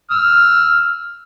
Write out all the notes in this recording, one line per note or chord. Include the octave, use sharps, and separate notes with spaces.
E6 F6